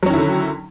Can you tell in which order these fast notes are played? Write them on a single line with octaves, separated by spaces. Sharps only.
F#3 C#4 D#3 E4 D3